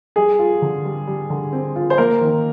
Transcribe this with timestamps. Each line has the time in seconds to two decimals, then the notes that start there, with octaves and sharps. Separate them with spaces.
0.16 G3 G#4
0.39 F4
0.62 D3
0.85 G3
1.07 G3
1.30 D3
1.53 C4
1.76 F4
1.90 C5
1.98 A#3 A#4
2.21 D#3